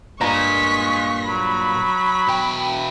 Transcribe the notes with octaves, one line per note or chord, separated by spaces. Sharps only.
G2 A#2 G#3 A#5 C#6 B6
F#3 B5
B2 G5